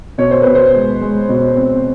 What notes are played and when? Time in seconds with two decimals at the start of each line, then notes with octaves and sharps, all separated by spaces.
0.18 B2 C#5
0.31 C5
0.42 B2 B4
0.55 C5
0.74 G#3
1.01 G#3
1.29 B2
1.57 C4